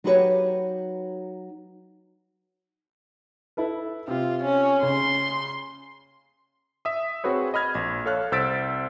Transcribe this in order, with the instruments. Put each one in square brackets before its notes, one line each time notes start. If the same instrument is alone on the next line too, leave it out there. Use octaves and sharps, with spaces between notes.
[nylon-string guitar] F#3 D#4 F#4 G4 B4 C#5
[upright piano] E4 A4 B4
[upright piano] C3 [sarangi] F4
[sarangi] C#4
[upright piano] C#3 G#5 [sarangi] C6
[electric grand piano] E5 D#6
C4 F#4 G#4 B4 C#5
D#5 B5 F6 G#6
A#1 G#6
A4 C#5 F5 F6 F#6
C2 C5 E6 A6 B6 D7